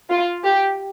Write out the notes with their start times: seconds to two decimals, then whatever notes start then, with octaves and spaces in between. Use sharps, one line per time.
0.10 F4
0.44 G4